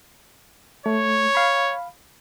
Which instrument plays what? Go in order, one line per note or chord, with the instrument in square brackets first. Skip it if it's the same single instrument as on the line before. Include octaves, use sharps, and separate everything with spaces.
[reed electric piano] A3 [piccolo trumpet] C#5
[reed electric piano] F5 B5